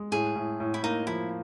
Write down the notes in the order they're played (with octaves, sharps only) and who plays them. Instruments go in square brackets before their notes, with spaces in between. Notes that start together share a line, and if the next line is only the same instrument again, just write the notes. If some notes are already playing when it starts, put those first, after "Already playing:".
Already playing: [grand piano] G#3
[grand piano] A2 [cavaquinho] G#4
[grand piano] A2
A2
[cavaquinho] E4
[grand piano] A#3 [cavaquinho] D#4
[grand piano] F3 [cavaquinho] E4